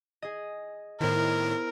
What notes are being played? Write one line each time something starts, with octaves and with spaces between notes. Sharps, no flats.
G#4 D#5
A2 D#3 B3 E4 A#4 C5